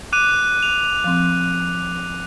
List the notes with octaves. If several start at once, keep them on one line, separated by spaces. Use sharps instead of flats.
D6 F#6 D#7
F7
F3 C4